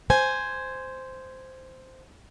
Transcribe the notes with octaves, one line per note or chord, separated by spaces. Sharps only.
C5 G#5